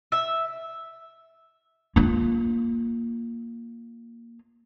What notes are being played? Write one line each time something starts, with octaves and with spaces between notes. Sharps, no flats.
E5
A#3 F4